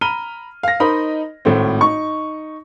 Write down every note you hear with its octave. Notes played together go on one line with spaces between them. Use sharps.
A#5 B5 F6 D#7 G7
F5 A#6
D#4 A#4 C5 D#5 B5
G#1 A2 A3 C4
D#4 C#6